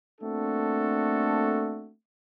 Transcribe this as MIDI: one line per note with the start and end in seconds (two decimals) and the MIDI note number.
0.21 1.91 57
0.21 1.91 58
0.21 1.91 60
0.21 1.91 62
0.21 1.91 66
0.21 1.91 69